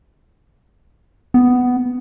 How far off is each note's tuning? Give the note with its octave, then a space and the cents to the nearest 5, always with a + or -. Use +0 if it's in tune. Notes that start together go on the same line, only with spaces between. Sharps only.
B3 +10